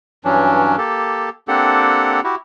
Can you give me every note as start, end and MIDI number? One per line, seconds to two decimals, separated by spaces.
0.25 0.76 43
0.25 0.76 52
0.25 0.76 54
0.25 0.76 61
0.25 0.76 62
0.78 1.29 58
0.78 1.29 67
0.78 1.29 69
1.48 2.20 58
1.48 2.20 60
1.48 2.20 62
1.48 2.20 67
1.48 2.20 69
1.48 2.20 78
2.24 2.35 64
2.24 2.35 66
2.24 2.35 67